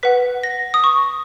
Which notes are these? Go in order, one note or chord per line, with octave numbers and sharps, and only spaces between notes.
B4 F#5 B6
A#6
D#6
C#6